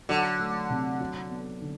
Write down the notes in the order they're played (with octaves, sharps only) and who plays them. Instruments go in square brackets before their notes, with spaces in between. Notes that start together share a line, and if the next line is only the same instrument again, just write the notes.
[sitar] D3 [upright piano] F#3
[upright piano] A3
C3
F#3
B3
D3